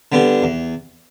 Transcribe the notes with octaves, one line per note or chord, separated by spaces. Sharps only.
D3 G3 B3
E2